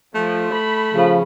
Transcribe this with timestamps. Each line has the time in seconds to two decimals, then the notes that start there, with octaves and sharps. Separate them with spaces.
0.15 F3 A3
0.53 B5
0.93 C#3 F3